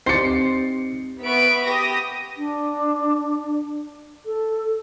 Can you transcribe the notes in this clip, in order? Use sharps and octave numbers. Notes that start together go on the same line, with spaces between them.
C4 D#4 G4 C5 D5 C7 C#7
B3 B4 E5 B5 C#6 D7
G4 D#6 A#6
D4
A4